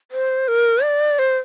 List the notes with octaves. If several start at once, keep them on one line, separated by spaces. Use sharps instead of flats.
C5
A#4
D5
C5